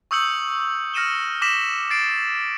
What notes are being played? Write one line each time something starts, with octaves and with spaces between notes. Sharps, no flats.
C#6 D#6 E6 G6 C#7 F#7
F6 A#6 C#7 D#7 E7 G7
D6 F6 A#6 B6 E7 F#7
A6 C7 D7